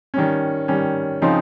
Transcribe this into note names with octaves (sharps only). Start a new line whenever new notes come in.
D#3 G3 C#4
D#3 G3 C#4
C#3 F3 C4 D#4